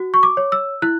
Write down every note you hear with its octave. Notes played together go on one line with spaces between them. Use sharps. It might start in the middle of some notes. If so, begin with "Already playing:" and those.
Already playing: F#4
C#6
D6
C#5
E6
E4 F#6